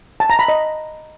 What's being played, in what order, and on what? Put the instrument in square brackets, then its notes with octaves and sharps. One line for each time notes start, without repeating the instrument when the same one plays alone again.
[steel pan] A5
A#5
B5
D#5